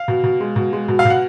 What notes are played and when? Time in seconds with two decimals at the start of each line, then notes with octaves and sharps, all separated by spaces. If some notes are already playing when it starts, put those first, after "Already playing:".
Already playing: F5
0.08 B2
0.24 B2
0.40 G#3
0.56 B2
0.73 G#3
0.88 B2
0.99 F5
1.05 B2
1.10 F#5